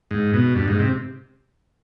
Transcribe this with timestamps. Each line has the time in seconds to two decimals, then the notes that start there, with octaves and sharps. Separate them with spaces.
0.11 G#2
0.33 B2
0.56 G2
0.68 G#2
0.79 C3